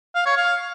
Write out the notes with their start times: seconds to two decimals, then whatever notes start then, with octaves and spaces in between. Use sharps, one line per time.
0.15 F5
0.26 C#5
0.37 F5